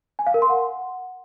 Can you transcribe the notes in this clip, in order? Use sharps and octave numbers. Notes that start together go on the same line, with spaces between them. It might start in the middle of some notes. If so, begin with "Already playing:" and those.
G#5
F5
A#4
C6
F#5